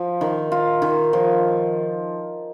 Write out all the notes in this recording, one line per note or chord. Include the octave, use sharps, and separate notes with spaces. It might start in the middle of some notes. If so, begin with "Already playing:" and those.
Already playing: F3
D#3
F4
D#3
F3